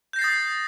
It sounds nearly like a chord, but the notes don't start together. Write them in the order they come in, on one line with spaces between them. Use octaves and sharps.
G6 A#6 C7 A6 D#6